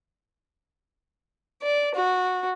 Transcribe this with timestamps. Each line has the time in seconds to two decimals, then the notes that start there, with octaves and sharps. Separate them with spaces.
1.62 D5
1.95 F#4